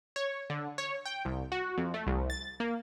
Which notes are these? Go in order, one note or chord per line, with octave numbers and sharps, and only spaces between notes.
C#5
D3
C#5
G5
C2
F#4
F2
A3
C2
A6
A#3